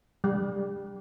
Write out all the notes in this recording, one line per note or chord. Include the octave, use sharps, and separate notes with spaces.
G3